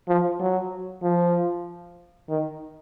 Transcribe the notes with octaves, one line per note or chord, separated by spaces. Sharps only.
F3
F#3
F3
D#3